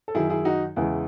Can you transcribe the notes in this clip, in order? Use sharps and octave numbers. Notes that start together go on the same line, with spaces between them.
A4
F#2 D#3 F#3 E4 G#4
E4 G#4
D#4 F#4
E2 C#3 E3 G#3 E4